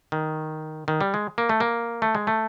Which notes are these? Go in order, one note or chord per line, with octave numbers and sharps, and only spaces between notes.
D#3
D#3
G3
G#3
A#3
A3
A#3
A3
G#3
A3